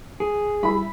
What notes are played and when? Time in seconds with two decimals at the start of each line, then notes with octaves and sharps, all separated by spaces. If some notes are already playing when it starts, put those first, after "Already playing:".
0.20 G#4
0.63 G3 E4 E5 B5